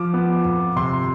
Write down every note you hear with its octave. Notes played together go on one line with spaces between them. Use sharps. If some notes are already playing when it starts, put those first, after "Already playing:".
Already playing: F3 D6
B3
F2
C3 C6